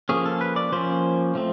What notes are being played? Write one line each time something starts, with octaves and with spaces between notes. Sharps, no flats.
F3 A#3 C#4 G#4
A4
B4
D5
F3 A#3 C#4 C5
F3 A3 C4